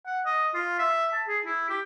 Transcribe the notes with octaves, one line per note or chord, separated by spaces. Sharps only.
F#5
D#5
F4
E5
A5
G#4
E4
G4